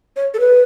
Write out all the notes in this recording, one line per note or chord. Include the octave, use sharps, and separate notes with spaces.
C#5
A4
B4